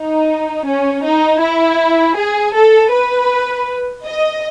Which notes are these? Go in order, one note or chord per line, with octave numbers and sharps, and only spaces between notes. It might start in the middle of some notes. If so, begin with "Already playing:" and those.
Already playing: D#4
C#4
D#4
E4
G#4
A4
B4
D#5